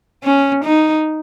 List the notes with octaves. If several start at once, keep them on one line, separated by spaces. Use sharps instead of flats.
C#4
D#4